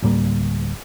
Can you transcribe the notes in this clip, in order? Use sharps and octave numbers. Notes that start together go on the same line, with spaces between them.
D2 A2 G3 A#3